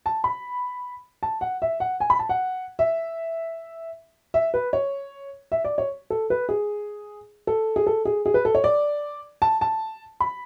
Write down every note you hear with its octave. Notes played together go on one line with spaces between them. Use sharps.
A5
B5
A5
F#5
E5
F#5
G#5
B5
A5
F#5
E5
E5
B4
C#5
E5
D5
C#5
A4
B4
G#4
A4
G#4
A4
G#4
G#4
B4
A4
C#5
D5
A5
A5
B5